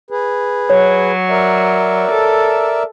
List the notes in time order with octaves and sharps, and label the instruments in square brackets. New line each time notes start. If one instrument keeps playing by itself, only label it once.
[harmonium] G#4 B4
[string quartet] F#3 [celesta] C#5
[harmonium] A#4 D5 E5
[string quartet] A4